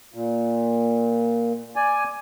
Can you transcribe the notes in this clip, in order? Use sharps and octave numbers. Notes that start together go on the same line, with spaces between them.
A#2
D5 G#5